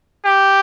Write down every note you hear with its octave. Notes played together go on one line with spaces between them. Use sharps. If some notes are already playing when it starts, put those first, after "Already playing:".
G4